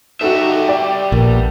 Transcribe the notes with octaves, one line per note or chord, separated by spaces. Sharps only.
G3 D#4 F#4 A4 E5
D5 G5
A#1 B3 D4 A#4